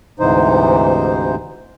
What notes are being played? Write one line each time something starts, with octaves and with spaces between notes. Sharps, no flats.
D2 G#2 C3 E3 D#4 C5